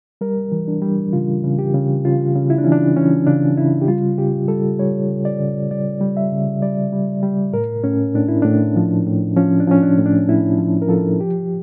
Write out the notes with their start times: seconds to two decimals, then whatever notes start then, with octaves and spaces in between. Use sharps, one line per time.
0.21 G3 A#4
0.52 E3
0.68 D4
0.82 G3
1.13 C#3 F4
1.44 C#3
1.59 G4
1.75 C#3
2.05 C#3 F4
2.36 C#3
2.50 E4
2.58 D4
2.64 E3 C#4
2.72 D4
2.96 E3 C#4
3.27 C#3 D4
3.57 C#3 E4
3.82 G4
3.88 G3 F4
4.18 C#3 G4
4.48 G3 A4
4.79 G3 C#5
5.09 C#3
5.25 D5
5.40 C#3
5.71 G3 D5
6.01 G3
6.17 E5
6.32 C#3
6.62 G3 D5
6.93 G3
7.23 G3
7.53 A2 A#4
7.84 A2 C#4
8.15 A2 D4
8.28 E4
8.42 A2 D4
8.76 F3
9.07 A2
9.36 F3 C#4
9.60 D4
9.67 F3 C#4
9.83 D4
9.98 A2
10.06 D4
10.28 A2 E4
10.59 F3
10.82 A#4
10.89 F3 A4
11.20 F3 G4